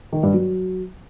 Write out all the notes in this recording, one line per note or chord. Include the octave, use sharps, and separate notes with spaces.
D#3
G2
F#3